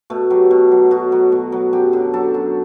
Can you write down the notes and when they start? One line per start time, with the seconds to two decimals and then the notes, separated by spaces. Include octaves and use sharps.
0.10 B2 A3
0.30 F#3 G4
0.51 B2
0.71 F#3
0.91 B2 F#4
1.12 F#3
1.32 B2
1.52 F#3
1.73 F#2 G4
1.93 D3
2.14 F#3 A4
2.34 F#2